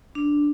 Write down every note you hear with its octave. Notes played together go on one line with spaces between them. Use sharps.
D4